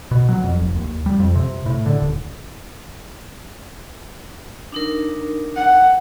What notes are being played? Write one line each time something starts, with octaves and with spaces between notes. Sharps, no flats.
B2
F#3
F2
F1
D#2
G3
F2
C3
A2
D3
D#1
D4 D#4 A#4
F#5